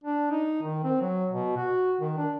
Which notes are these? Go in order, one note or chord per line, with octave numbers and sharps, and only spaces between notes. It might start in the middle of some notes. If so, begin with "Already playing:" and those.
D4
D#4
D#3
C4
F#3
B2
F#4
D#3
D4